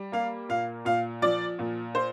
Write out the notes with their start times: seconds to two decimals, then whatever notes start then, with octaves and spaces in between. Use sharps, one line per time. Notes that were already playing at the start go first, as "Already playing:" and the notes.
Already playing: G3
0.12 A#3 F5
0.49 A#2 F5
0.85 A#2 F5
1.22 F3 D5
1.59 A#2
1.95 C5